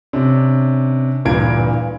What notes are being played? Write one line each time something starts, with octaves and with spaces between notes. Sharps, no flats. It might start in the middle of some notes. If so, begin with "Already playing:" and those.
C3 C#4 D4
D1 G2 A#2 E3 G#6 D7